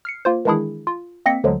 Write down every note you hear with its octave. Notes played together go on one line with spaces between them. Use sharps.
F6 C7 C#7
A#3 F4 C5
D#3 E3 G#3 D4 E4 G#4
F4
A#3 C4 D#5 A#6 B6 C#7
D2 D3 F3 F#3 G#3